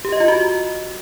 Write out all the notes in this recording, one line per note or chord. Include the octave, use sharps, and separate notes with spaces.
G4
D#5
F4
F#4